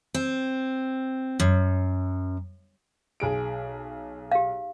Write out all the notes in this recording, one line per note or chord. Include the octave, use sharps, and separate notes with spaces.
C4
F#2
B1 G#4 D7
G4 F5